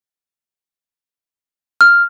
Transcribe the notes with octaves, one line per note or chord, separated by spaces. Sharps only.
F6